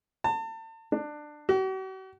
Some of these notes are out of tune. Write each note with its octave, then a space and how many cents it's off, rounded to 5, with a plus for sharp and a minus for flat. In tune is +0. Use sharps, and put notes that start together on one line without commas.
A5 +35
D4 +20
F#4 +45